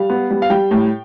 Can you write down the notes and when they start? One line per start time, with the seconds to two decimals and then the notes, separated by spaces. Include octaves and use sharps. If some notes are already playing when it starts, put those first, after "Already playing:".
Already playing: G3 F5
0.10 B3
0.31 G3
0.42 F5
0.50 G3 G5
0.71 A2